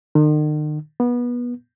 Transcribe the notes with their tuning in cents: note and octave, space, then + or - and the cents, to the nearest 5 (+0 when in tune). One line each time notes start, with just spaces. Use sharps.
D#3 -45
B3 -25